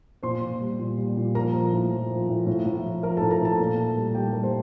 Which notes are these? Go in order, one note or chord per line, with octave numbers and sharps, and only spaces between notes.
A#2 C5 C6
A#2
G3
A#2
G3
A#2
F3 A#4 A#5
F3
A2
F3
F3
A2
A2
A2
F3
F3 A#4 A#5
A2 A4 A5
A#4 A#5
A2 A4 A5
A#2
A#2
G3
G3 G4 G5
G3 A#4
C5